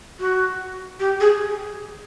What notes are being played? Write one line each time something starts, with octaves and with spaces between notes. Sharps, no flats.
F#4
G4
G#4